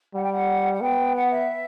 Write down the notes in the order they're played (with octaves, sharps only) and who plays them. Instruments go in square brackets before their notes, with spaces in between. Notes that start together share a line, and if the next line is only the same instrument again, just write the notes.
[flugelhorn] G3 [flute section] F#5
[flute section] G5
F#5
F#5
[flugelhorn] B3 [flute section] G5
[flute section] F#5
E5